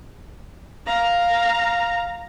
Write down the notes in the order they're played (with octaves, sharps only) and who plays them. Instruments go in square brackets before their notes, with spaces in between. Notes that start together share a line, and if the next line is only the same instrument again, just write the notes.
[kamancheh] F5 A#5